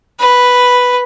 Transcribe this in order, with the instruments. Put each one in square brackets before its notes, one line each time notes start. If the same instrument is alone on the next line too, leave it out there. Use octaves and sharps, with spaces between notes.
[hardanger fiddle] B4